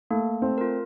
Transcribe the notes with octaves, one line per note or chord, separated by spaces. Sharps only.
A3 A#3
A3 C4
F4 A#4